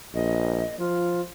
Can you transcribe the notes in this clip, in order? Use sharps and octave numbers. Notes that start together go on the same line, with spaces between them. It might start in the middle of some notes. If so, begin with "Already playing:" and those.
A#1 D#5
F3 F4